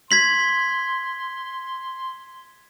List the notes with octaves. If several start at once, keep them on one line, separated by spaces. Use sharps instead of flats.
C6 G#6 B6 F#7